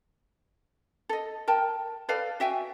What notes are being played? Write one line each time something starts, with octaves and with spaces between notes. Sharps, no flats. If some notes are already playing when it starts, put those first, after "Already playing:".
A4 D#5
A#4 G5 A5
A4 B4 D5 F5
F#4 E5 G5 G#5